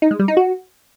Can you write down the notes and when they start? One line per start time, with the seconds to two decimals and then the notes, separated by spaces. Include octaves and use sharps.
0.02 D#4
0.11 G#3
0.19 G3
0.28 D#4
0.37 F#4